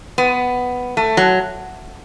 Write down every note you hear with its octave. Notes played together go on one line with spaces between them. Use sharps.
B3
A3
F#3